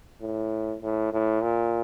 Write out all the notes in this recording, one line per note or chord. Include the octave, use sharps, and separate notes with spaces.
A2
A2
A2
A#2